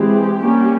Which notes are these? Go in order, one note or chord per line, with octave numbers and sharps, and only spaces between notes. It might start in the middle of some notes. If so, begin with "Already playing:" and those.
Already playing: E3 G#3 C4 G4
G3 A#3 C#4